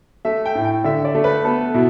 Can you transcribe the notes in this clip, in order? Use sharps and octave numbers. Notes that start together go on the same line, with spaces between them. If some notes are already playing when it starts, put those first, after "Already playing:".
A3 E5
G5
A2
G5
D3 E5
D5
A3
B4
B3 A4
B2 E4